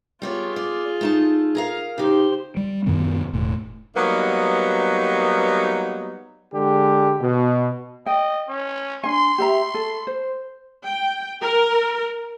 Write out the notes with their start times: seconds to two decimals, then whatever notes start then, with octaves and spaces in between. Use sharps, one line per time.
0.22 G3 B3 F4 G#4 C#5
0.56 D5
1.01 A3 D#4 A5
1.55 G#4 A#4 F5
1.98 C#3 D#4 G4 C5
2.57 G3
2.86 F#2 A#2 D#3 B3
3.33 E1 A2 A3
3.96 F#3 G3 A#3 B3 D#4
6.54 D3 G#3 G4
7.21 B2
8.06 D#5 G5
8.48 C#4
9.04 D4 G#5 C6
9.38 G4 E5 A#5
9.74 A4
10.07 C5
10.83 G5
11.42 A#4